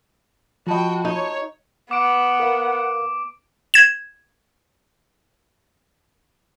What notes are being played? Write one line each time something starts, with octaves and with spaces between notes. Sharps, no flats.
F3 F4 F#4 D#5 G5 A5 B5
D#4 C#5
B3 F#5 D6 D7
A#4 F5
G#6 E7